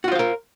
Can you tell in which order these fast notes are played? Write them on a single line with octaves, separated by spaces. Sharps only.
F#4 F4 C5 F5 A#4